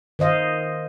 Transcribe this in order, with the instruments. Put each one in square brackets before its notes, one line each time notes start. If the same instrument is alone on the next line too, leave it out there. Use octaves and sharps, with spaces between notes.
[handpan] D#3 C5 D#5 F5